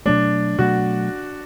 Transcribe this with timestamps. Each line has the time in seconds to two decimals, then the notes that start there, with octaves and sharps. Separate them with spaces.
0.05 B2 F#3 A3 D4
0.59 B2 F#3 A3 F#4